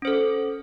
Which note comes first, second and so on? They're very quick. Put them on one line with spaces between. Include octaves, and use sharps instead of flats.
C#4 C5 A4